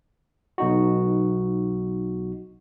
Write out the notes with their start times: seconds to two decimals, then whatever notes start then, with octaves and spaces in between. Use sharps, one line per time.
0.58 B1 D#4 F#4